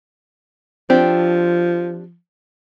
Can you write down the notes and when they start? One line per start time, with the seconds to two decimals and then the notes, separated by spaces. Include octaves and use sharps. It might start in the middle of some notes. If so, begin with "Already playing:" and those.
0.90 F3 C4 D4 G4